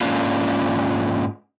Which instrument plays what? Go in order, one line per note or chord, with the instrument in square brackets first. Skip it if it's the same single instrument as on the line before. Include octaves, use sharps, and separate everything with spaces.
[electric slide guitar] G#2 A#3 C#4 D4 F4